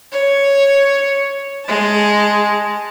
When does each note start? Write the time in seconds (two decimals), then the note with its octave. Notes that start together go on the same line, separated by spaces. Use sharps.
0.12 C#5
1.66 G#3 A5